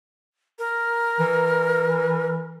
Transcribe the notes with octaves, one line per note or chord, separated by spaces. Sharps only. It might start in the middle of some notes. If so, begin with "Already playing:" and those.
A#4
E3